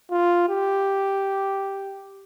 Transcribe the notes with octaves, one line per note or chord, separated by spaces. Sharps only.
F4
G4